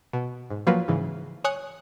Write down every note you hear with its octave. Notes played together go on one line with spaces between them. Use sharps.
B2
G#2
F3 F#3 A#3 F4 B4
G#2 C#3 E3
C#5 G#5 D#6 F#6 C#7